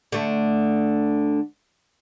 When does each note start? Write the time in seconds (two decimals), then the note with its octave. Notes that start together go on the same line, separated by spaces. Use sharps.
0.12 D3 A3